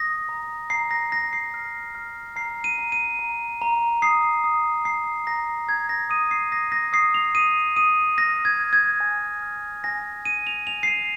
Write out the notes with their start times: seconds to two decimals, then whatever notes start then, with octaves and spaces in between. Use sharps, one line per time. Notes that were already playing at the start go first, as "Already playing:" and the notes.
Already playing: D#6 A#6
0.29 A#5
0.70 A#5 C7
0.91 A#6
1.11 A#5 A#6
1.33 C7
1.54 F6
1.95 F6
2.36 A#5 C7
2.64 D#7
2.78 A#5
2.92 D#7
3.19 A#5
3.62 A#5
4.02 D#6 C7
4.44 D#6
4.85 A#5 C7
5.27 A#5 A#6
5.69 A#5 G#6
5.89 A#6
6.10 D#6 D#7
6.31 C7
6.52 D#6 A#6
6.72 A#6
6.93 D#6 C7
7.14 F7
7.34 D#6 D#7
7.76 D#6 D#7
8.17 F6 A#6
8.45 G#6
8.59 F6
8.73 G#6
9.00 G#5
9.42 F6
9.84 G#5 A#6
10.25 G#5 D#7
10.47 F7
10.67 G#5 F7
10.83 C7
10.88 D#7